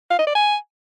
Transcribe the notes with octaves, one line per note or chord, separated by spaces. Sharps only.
F5
D#5
D5
G#5